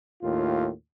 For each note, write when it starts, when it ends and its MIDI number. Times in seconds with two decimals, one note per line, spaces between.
0.23 0.70 39
0.23 0.70 45
0.23 0.70 65